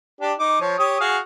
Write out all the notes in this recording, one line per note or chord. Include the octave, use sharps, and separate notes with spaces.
D4 G4
D#4 D6
F3 C#5
G4 C#5 D#6
F#4 G#4 F5